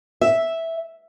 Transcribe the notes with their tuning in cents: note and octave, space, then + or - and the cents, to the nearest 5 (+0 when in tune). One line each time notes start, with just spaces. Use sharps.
E5 -5